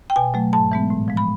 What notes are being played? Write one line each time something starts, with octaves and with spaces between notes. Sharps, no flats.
G5
B2 G#5
F#3 A3
G#2 A5
E3 G#3 B3
A2
F3 G#3
B5